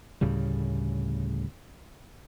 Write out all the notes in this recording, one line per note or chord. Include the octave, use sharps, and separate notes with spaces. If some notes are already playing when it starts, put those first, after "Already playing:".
D2 A2 C#3 G3